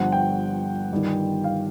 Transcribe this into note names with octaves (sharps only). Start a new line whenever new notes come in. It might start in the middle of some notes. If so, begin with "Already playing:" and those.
Already playing: G1 G2 D3 F3 F#5
G5
G1 G2 D#3
F5